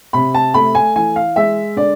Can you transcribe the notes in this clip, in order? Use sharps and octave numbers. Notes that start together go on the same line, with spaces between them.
C3 B5
A5
A3 B5
G#5
E3 G#5
F5
G#3 E5
D3 D5